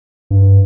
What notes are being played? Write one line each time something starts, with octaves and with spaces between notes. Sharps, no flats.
G2